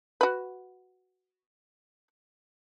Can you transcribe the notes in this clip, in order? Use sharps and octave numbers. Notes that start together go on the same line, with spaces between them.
F#4 B4